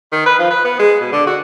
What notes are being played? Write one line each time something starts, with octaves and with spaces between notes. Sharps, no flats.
D#3
B4
F3
B4
B3
G#3
B2
D3
F#4